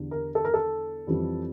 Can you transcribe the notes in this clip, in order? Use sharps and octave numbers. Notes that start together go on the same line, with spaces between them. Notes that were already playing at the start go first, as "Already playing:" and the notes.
Already playing: E2 D3 G3
A#4
A4
A#4
A4
F2 E3 G3